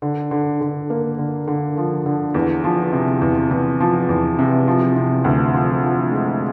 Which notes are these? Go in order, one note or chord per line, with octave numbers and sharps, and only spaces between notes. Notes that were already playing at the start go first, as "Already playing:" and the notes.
D3
D3
D3
A#3
D3
D3
F3
D3
E2
F3
C3
E2
E2
F3
E2
C3
F3
C3
D2
F3
F3
G#3